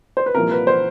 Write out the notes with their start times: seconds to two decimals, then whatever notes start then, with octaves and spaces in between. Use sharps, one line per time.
0.17 C5
0.26 B4
0.35 C2 A#2 F3 A#4
0.51 B4
0.67 C5